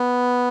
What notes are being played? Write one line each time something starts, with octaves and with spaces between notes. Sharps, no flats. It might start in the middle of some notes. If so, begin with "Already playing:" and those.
Already playing: B3